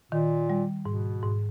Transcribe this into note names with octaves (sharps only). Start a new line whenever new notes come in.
A#2 D#3
G3
G#2 B2
G#2